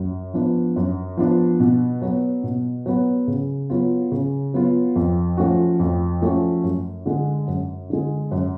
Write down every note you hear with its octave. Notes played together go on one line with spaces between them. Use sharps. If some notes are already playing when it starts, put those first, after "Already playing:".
Already playing: F#2
F3 B3 D4
F#2
F3 B3 D4
B2
F#3 B3
B2
F#3 B3
C#3
F#3 B3 F4
C#3
F#3 B3 F4
F2
F3 A3 C#4 F#4
F2
F3 A3 C#4 F#4
F#2
D3 G#3
F#2
D3 G#3
F#2